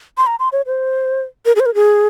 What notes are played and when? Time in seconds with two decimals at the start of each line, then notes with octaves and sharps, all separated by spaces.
0.18 C6
0.27 A#5
0.39 C6
0.52 C#5
0.66 C5
1.45 A#4
1.56 G#4
1.60 C5
1.66 A#4
1.75 G#4